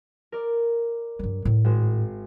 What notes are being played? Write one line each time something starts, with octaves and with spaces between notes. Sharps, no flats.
A#4 D5
G2 F#3
A2
G#1 G#3 E7